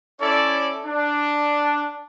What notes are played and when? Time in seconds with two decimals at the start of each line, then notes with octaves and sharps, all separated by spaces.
0.20 C#4 E4 A4 C#5 D5
0.85 D4